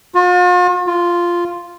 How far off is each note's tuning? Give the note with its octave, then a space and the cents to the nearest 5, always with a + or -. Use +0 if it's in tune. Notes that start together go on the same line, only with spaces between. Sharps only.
F4 +45
F4 -5